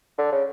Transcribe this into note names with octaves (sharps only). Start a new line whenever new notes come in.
D3
C#3